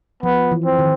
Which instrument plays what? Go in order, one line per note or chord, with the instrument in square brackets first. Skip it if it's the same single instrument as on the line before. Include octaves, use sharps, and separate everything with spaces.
[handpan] F3 [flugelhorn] B3
[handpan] E3
[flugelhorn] C4
[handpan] D#3